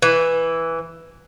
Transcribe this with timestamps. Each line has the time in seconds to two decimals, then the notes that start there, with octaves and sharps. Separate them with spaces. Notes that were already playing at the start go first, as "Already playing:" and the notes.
0.02 E3